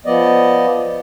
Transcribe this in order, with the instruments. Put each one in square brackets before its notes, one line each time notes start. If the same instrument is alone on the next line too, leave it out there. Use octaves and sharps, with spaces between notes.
[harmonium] F3 B3 D5 D#5